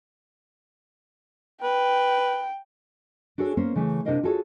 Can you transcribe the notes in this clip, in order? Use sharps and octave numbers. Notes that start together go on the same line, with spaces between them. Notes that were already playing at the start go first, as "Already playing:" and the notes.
B4 G5
D4 F#4 G#4 A4 C#5
A#3 B3 C#4 C5
C#3 E3 A3
C3 D4 E4 A#4 D#5 F5
F4 F#4 G#4 A4 B4 C#5